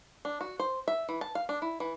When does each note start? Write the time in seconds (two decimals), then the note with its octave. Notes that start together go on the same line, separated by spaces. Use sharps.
0.25 D4
0.41 F#4
0.60 C5
0.88 E5
1.09 E3
1.21 A5
1.35 F5
1.49 D4
1.62 E4
1.80 E3